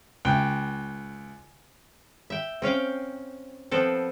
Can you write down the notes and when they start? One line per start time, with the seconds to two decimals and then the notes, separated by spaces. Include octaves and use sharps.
0.25 C#2 G5
2.30 E5 G5
2.62 C4 C#4 F5 G5
3.71 F3 B3 C4 A4